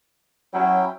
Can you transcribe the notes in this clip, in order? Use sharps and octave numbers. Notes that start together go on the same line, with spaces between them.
F#3 C#4 E4 G5